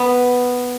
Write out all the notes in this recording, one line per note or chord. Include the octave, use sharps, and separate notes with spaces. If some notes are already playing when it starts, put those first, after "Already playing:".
Already playing: B3